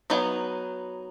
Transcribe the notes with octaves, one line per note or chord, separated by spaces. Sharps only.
F#3 B3 D#4